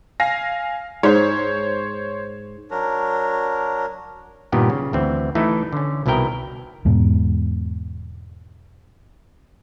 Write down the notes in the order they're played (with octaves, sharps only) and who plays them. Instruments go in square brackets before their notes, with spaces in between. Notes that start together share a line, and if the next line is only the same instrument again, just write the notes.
[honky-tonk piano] F5 G#5 A#6
[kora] G#2 [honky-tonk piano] C5 C#5
[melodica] F#3 D4 A#4
[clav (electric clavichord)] G2 A#2 D#3 B3 G4
C#3
D2 E3 C4
E3 A3 D#4 E4
D3 C#4
C2 B2 D#3 E4 A#4 G5
[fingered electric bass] E2 G#2 B2